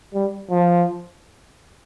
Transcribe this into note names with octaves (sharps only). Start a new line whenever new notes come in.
G3
F3